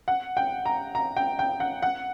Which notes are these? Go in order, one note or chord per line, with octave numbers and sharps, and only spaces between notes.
F#5
G5
A#5
A#5
G5
G5
F#5
F#5